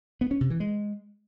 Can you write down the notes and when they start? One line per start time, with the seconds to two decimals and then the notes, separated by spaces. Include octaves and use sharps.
0.21 B3
0.31 C#4
0.41 C3
0.50 E3
0.60 G#3